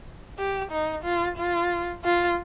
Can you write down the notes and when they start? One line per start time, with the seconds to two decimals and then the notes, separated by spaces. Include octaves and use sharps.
0.39 G4
0.72 D#4
1.05 F4
1.38 F4
2.04 F4